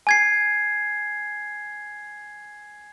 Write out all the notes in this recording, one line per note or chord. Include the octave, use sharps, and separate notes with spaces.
G#5 G#6 C7